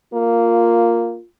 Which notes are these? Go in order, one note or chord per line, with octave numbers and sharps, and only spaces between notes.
A#3 F4